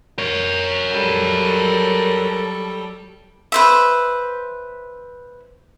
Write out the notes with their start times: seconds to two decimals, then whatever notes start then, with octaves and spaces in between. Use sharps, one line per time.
0.19 A#4 C#5
0.91 F#3 G3 A4
3.52 B4 C5 E5